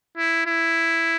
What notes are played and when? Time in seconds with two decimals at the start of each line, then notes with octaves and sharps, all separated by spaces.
0.17 E4
0.46 E4